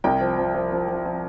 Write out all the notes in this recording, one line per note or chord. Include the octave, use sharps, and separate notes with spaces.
C2 G5
F3
F3
F3
F3
F3
F3